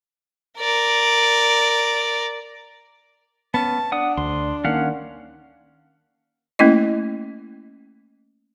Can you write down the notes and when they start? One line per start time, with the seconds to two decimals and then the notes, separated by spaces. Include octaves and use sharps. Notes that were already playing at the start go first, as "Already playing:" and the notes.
0.59 A#4 D5
3.54 B3 C#4 A5
3.92 D4 F#5 D#6
4.17 D2 C6
4.64 D#3 A#3 C#4 F5 F#5
6.59 A3 A#3 C#4 E4 D#5